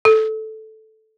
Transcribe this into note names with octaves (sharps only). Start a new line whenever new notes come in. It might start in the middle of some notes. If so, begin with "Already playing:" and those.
A4